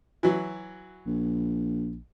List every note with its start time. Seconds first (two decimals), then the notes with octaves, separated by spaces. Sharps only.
0.23 E3 F#3
1.06 A#1